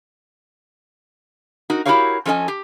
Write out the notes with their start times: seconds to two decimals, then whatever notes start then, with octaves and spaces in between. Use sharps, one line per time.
1.70 D#4 F#4 A#4
1.85 E4 F#4 G4 A#4 C#5 F5
2.26 F3 C#4 A4 D#5 G#5
2.48 G4